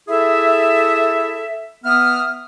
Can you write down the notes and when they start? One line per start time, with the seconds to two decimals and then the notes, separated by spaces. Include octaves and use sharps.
0.08 E4 G#4 A4 E5
1.84 B3 E5 D#6 F6